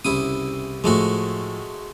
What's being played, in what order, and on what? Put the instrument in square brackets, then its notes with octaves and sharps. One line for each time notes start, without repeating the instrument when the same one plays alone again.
[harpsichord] C2 E4 D#6 [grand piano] C#3
[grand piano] A2 F3 [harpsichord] G#3 A3 F#4